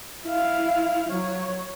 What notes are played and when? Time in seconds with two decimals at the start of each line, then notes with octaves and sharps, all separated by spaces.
0.24 E4 F5
1.09 F#3 C#5